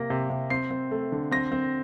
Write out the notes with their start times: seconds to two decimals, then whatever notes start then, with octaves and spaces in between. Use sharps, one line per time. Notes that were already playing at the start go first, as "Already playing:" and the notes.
Already playing: C3 A#3 A#6
0.10 C3
0.30 C3
0.50 C4 C7
0.71 C4
0.91 A3
1.12 D3
1.31 C4 A#6
1.52 C4